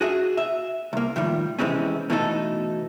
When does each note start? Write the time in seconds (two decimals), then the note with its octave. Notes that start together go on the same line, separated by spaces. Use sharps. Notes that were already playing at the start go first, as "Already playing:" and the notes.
0.01 F#4 G#4 E5
0.37 E5
0.93 C2 A#3
1.16 A2 D#3 F3 G3
1.59 C3 E3 G#3 C4 C#4
2.10 B2 E3 A3 D#4 F4 A4